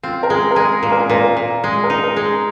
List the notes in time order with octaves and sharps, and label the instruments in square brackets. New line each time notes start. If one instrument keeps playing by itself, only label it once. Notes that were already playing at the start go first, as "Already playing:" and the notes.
[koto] C4 [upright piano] F4
[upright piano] A#4
[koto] G#3 [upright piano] G#4
[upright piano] A#4
[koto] G#3 [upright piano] G#4
[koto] A#2
[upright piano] A#4
G#4
[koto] A#2 [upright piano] A#4
[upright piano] A#4
[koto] A#2
[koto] G#3 [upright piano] G#4
[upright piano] A#4
[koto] D#4
[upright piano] A#4
[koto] G#3
[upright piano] G#4